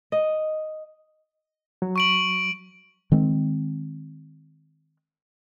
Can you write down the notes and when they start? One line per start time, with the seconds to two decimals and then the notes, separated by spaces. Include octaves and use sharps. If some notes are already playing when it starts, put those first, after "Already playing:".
0.12 D#5
1.82 F#3
1.96 C#6 D7 F#7
3.12 D#3 G#3 C4